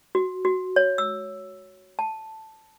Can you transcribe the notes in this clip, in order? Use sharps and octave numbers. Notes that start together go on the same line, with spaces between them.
F#4
F#4
C#5
E6
A5